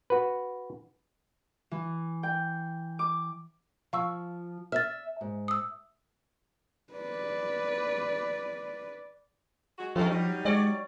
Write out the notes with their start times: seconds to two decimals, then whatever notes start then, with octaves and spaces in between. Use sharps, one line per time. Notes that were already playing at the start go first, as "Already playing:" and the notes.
0.10 F#4 B4
1.71 E3
2.23 G5
2.99 D6
3.93 F3 F5 C#6 E6
4.72 E5 F6 A6
5.21 G#2
5.48 D#6 E6
6.93 B4 D5
9.78 G#3 F#4
9.96 F2 F3 G#3 A4
10.10 F#3 G3 D#4
10.45 G#3 C#5 D5